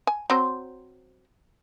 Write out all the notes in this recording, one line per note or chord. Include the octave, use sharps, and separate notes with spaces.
G#5
F#3 C4 C5